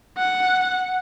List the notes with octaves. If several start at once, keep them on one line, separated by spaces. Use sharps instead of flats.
F#5